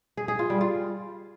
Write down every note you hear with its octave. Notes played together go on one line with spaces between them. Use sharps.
G#4
G#4
F4
G3
F4